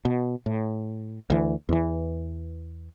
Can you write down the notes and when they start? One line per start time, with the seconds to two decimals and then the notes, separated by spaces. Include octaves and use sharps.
0.05 B2
0.46 A2
1.30 D2 E3
1.69 E2 E3